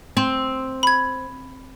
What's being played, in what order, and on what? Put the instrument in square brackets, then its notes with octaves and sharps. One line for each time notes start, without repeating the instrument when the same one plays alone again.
[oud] C4
[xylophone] B5 G#6